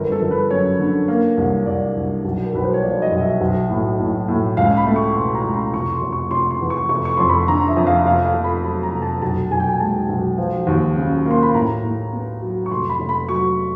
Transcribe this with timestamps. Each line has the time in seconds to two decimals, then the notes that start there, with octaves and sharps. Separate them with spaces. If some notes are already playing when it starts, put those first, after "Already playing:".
Already playing: G1 A#4
0.12 A4
0.22 G1
0.31 B4
0.50 F#2 C#5
0.79 D3
1.08 A#3
1.37 C2
1.66 C2 D5
1.96 C2
2.25 B1
2.45 A#4
2.54 B1 B4
2.64 C5
2.74 C#5
2.83 F3 D5
3.02 D#5
3.12 B1
3.21 E5
3.41 B1
3.70 A2
4.00 A2
4.28 A2
4.57 C#2 F5
4.77 B5
4.86 A3
4.96 C#6
5.15 B2 C6
5.35 A#5
5.44 C#2
5.54 A#5
5.74 F1 C#6
5.93 C6
6.02 F1
6.12 C#6
6.31 F1 C6
6.51 C6
6.61 E2
6.70 C#6
6.89 F1 C#6
7.05 C#6
7.17 F2 C6
7.29 B5
7.48 D3 A#5
7.68 E5
7.77 F2
7.87 F5
8.06 F1 F5
8.25 F5
8.34 F1
8.44 B5
8.64 F#3 B5
8.83 A#5
8.93 F1
9.02 A5
9.22 B1 A5
9.51 B1 G#5
9.60 G5
9.68 G#5
9.80 G#3 A5
10.09 B1
10.38 F3
10.67 D#2
10.96 C#3
11.26 A#3 C6
11.43 B5
11.55 A2 A#5
11.83 A2
12.13 B3
12.42 F#3
12.66 C#6
12.71 F1 C6
12.89 B5
13.00 F1
13.09 B5
13.29 F#3 C#6